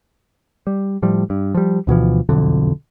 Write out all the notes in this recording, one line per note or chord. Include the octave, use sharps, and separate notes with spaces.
G3
A2 F3 G3
G2
F3 G3
D2 B2 E3 F3
E1 B1 F2 D3